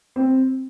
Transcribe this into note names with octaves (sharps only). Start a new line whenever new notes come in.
C4